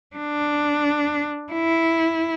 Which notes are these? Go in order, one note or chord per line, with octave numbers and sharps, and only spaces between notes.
D4
E4